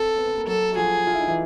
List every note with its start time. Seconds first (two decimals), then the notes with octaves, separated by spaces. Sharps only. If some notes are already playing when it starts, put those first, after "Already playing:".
Already playing: C4 A4
0.17 B3 B4
0.27 B3 B4
0.37 A#3 A#4
0.47 F#3 F#4 A4
0.73 F#4
0.76 F3 F4 G#4
1.07 F4
1.14 E4
1.20 D#4
1.27 E3 E4